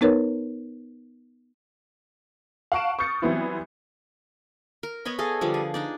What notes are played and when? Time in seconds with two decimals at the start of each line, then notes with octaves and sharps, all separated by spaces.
0.01 B3 D#4 A#4 B4 C#5
2.72 F5 F#5 A5 C#6 D7 E7
2.99 C#6 D#6 F6 G6 A6 C#7
3.22 E3 F#3 G3 B3 C4 E4
4.83 A#4
5.05 B3 C#5 D#5 B5
5.19 G#4 A4 D#5 F5
5.41 D3 F3 G3
5.54 G#4
5.74 D4 D#4 D5